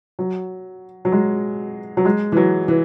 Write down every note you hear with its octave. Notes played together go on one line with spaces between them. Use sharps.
F#3
F#3
G#3
F#3
G#3
E3
F#3
E3